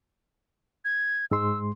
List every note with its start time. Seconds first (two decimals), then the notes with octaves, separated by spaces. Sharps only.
0.85 G#6
1.31 G#2 G#3 C6 E6